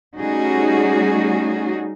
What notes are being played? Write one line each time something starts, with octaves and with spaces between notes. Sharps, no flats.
G3 A3 C#4 D#4 F#4 G#4